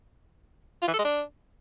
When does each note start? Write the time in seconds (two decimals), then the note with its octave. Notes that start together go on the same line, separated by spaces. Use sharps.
0.82 F4
0.88 E3
0.93 A4
0.99 G#3
1.04 D4